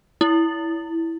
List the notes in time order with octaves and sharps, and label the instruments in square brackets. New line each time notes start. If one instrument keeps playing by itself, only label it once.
[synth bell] E4